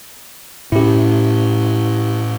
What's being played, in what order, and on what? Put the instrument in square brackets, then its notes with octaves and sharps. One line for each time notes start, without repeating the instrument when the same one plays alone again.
[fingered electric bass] A2 C#4 [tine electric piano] E4 G4